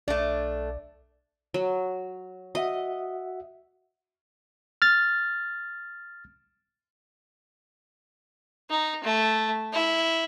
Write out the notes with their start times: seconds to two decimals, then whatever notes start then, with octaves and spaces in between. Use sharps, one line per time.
0.08 B1 A3 D4 D5
1.54 F#3
2.55 F#4 D#5 E5 F#5
4.82 F6 A6
8.70 D#4
9.04 A3
9.73 E4